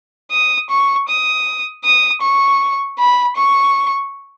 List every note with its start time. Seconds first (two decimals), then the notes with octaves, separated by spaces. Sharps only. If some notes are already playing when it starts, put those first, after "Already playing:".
0.31 D#6
0.70 C#6
1.08 D#6
1.85 D#6
2.22 C#6
2.99 B5
3.36 C#6